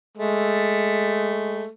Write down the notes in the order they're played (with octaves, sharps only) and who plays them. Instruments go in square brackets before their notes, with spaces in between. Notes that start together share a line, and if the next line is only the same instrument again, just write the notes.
[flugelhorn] G#3 [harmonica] A3